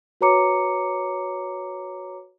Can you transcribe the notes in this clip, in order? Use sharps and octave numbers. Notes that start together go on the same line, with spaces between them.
F#4 B4 C#5 A#5 D6 C#7